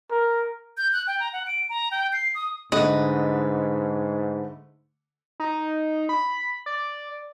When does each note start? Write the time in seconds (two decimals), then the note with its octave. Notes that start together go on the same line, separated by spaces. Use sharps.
0.11 A#4
0.77 G6
0.93 F#6
1.07 G5
1.20 A#5
1.33 F#5
1.47 D7
1.69 A#5
1.91 G5
2.13 C7
2.35 D#6
2.72 G#2 D3 A3 B4 D#5
5.40 D#4
6.09 B5
6.66 D5